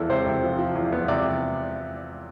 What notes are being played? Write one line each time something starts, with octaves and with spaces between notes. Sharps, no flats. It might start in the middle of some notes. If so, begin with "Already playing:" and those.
Already playing: E2 B3 A4
C3 C5
C3
F3
F3
E2
B3
C3 D5